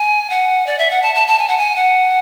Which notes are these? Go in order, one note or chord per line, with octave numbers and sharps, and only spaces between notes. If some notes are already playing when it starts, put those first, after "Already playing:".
Already playing: G#5
F#5
D5
E5
F#5
A5
A5
A5
G#5
F#5
G#5
F#5